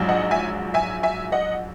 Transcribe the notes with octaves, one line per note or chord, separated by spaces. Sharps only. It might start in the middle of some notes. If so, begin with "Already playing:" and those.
Already playing: A#1 G#2 F#3
D#5 F#5
E5 G#5
E5 G#5
E5 G#5
D#5 F#5